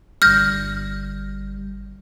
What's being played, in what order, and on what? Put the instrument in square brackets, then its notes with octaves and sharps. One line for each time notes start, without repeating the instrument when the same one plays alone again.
[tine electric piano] G1 G3 [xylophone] F6 G6 A#6